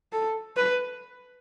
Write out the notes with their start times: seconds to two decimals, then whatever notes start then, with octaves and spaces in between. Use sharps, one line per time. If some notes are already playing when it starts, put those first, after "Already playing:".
0.12 A4
0.56 B4